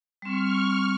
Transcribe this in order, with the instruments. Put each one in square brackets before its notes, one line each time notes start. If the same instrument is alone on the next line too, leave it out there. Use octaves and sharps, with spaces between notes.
[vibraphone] G3 C4 [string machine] C#6 F6